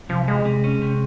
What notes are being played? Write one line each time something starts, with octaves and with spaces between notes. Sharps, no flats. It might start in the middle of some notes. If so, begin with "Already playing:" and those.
C3 F3
G3 G#3
C3
C#4
C3